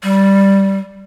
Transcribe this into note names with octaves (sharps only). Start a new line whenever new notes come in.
G3